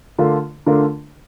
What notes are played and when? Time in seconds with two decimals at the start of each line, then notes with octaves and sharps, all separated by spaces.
0.18 D3 A3 D4 F4 A#4
0.66 D3 A3 D4 F4 A#4